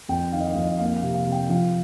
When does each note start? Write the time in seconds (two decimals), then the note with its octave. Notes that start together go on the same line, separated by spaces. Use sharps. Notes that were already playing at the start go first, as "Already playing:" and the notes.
0.09 F2 G5
0.32 D#3 F5
0.40 D#5
0.47 F5
0.55 F2 D#5
0.79 A#3 F5
0.97 F5
1.03 C3
1.14 F5
1.26 C3
1.32 G5
1.49 F3 F5